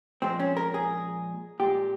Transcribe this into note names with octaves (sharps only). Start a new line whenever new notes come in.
A#2 F3 G#3 C4
C#4
A#4
G#4
A#2 G#3 G4